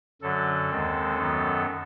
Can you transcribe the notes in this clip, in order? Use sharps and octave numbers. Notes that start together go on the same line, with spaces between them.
F#2 D3 F#3 A4
D#2 D#3 G#3 C4
F#2 D#3 F#3 B3